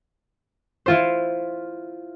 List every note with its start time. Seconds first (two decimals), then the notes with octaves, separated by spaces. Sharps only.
0.86 E4 F4 C5